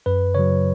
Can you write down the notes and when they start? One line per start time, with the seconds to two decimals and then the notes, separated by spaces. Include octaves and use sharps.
0.06 F#2 B4
0.35 C#3 F#3 C#5